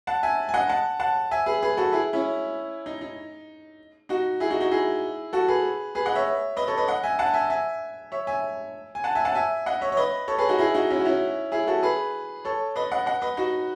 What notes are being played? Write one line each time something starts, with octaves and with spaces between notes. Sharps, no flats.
F#5 A5
E5 G#5
G#5
D#5 F#5
F#5 A5
F#5 A5
E5 G#5
G#4 B4
G#4 B4
F#4 A4
E4 G#4
C#4 E4
D#4
D#4
D#4 F#4
E4 G#4
D#4 F#4
D#4 F#4
E4 G#4
F#4 A4
G#4 B4
G#4 B4
D#5 F#5
C#5 E5
B4 D#5
A4 C#5
B4 D#5
D#5 F#5
E5 G#5
F#5 A5
E5 G#5
E5 G#5
C#5 E5
E5 G#5
G#5
F#5 A5
E5 G#5
F#5 A5
E5 G#5
D#5 F#5
C#5 E5
C#5
B4 D#5
A4 C#5
G#4 B4
D#4 F#4
E4 G#4
D#4 F#4
C#4 E4
F#4
C#4 E4
E4 G#4
F#4 A4
G#4 B4
A4 C#5
B4 D#5
D#5 F#5
D#5 F#5
B4 D#5
D#4 F#4